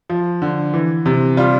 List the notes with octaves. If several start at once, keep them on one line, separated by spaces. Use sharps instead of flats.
F3
D3
E3
C3
G3 F4